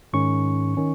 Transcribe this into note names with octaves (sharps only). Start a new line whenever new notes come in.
G#2 D#3 C#4 C#6
D#3 C#4